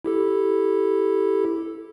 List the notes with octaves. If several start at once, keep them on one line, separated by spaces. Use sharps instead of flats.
E4 G4 A4